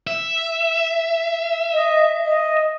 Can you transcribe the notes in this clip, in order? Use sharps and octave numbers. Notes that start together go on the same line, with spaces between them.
E5
D#5
D#5